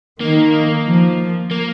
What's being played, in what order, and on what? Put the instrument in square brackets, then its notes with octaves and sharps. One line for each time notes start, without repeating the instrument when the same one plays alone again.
[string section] D#3 [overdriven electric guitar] A#3
[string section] F3
[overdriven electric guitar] A#3